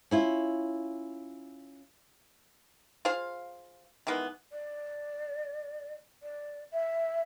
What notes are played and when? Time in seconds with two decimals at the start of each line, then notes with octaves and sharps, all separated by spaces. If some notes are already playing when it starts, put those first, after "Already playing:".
0.11 C#4 E4 F4
3.05 F4 G#4 C5 F5
4.07 D#3 E3 G#3 B3
4.52 D5
6.23 D5
6.73 E5